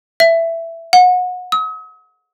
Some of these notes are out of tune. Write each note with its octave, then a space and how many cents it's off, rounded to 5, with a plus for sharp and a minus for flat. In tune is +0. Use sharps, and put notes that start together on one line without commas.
E5 +10
F#5 -30
D#6 +45